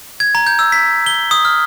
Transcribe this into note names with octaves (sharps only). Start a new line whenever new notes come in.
G#6
A#5
G6
E6
B6
G7
D#6
F6